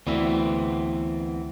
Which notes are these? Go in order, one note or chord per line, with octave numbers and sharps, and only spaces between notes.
D2 E3 B3 C4 E4 E5